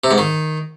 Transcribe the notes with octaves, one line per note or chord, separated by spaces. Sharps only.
C3
G#2
D#3